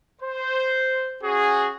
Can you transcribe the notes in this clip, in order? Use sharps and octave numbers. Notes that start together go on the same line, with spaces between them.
C5
C#4 F#4 G#4